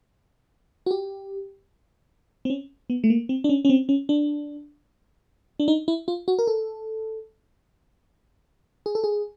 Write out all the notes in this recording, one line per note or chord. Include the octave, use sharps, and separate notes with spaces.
F#4
G4
C4
C#4
B3
A3
A#3
C4
D4
C#4
C#4
C4
C#4
D4
D4
D#4
E4
F4
F#4
A#4
A4
G#4
A4
G#4